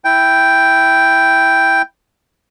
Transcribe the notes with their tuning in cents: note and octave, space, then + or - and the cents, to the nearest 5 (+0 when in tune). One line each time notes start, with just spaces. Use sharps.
E4 +0 G5 +0